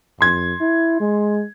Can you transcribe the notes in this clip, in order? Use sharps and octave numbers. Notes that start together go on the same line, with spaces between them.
F2 C6 G#6
E4
G#3